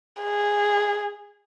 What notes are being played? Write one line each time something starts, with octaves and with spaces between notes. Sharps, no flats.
G#4